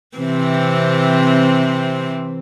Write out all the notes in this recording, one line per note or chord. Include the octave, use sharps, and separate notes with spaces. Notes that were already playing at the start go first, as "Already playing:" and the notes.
C3 E3 C4